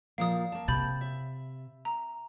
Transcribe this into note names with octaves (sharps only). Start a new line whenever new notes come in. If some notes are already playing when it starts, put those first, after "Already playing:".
A#2 F3 A#3 F5 D#6
A#3 A5
C3 B5 G6 A6
E5
A#5